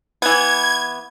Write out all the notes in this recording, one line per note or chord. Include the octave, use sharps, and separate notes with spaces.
E3 B3 G#6